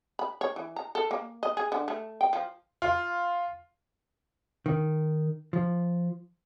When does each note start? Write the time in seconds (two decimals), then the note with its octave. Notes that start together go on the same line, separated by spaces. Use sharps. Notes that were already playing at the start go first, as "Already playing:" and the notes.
0.19 B5
0.41 C#5
0.56 E3
0.76 A#5
0.95 A4
1.11 A#3
1.43 D#5
1.57 G#4
1.72 D3
1.88 A3
2.21 G5
2.33 F3
2.82 F4
4.66 D#3
5.53 F3